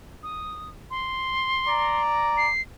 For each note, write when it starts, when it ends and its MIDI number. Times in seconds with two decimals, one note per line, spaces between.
0.23 0.70 87
0.91 2.02 84
1.69 2.50 74
1.69 2.50 82
2.37 2.61 96